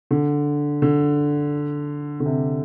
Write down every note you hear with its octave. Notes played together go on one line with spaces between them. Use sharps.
D3
D3
D3
C3